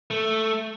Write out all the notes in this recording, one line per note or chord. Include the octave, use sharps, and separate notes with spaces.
A3